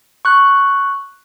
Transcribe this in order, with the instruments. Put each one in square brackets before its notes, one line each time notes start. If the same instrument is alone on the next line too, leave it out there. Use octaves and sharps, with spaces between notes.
[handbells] C#6 F#6